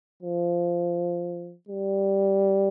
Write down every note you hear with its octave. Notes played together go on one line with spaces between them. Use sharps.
F3
G3